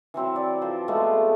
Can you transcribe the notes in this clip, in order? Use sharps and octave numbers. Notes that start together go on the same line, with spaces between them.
E3 F#3 C4 E4
D5
F3 C5
F3 G#3 A3 B3